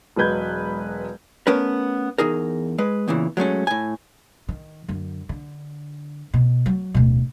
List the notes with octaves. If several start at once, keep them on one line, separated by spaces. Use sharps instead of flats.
E1 F#3 G#3 B4 G6 G#6
A3 B3 C#4 A#4 B4
E2 D#4 G#4 A#4
G#3 B4
E2 A#2 C#3 E3
F#3 G#3 A3 C#4
A2 G#5
D#3
F#2 D3
D3
B2
F#3
D1 B2